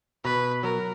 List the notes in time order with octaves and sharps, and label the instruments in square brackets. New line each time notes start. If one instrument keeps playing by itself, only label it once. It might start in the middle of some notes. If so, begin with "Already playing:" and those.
[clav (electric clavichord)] B2 [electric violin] B4
[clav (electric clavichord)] F#3 [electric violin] A#4